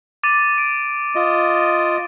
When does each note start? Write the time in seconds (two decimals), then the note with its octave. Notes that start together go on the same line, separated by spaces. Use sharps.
0.23 D6 A6 D#7
0.58 D7
1.15 F4 D#5